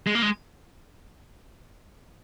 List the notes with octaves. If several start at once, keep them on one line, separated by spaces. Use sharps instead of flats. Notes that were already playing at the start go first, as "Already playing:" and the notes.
G#3
A#3
G#3